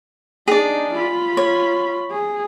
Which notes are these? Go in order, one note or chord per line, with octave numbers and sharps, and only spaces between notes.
D4 D#4 G#4 D5
F4 B5
C#5
G#4